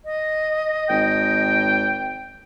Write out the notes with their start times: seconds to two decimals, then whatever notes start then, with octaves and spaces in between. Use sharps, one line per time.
0.05 D#5
0.89 G#1 G5